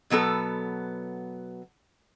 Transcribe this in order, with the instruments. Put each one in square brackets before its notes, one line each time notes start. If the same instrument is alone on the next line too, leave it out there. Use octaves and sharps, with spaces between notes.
[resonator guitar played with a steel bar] B2 F#3 B3 A4